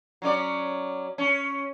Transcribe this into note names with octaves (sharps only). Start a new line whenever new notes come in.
F#3 C#4 D5
C#4